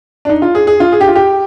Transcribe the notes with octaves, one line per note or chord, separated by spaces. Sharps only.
D4
D#4
F4
G#4
G#4
F4
G#4
G4
F4
G4